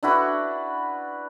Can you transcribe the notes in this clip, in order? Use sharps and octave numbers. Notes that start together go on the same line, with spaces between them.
D4 E4 F#4 B4